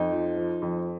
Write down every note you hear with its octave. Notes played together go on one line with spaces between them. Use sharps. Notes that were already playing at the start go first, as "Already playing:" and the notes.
Already playing: F2 D#4
F3
F3
F2